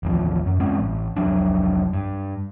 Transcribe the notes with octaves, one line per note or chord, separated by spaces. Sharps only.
A1 D#2 F3
F#2
G2 G#3 C4 C#4
A1
F1 C2 F#3 D4
G2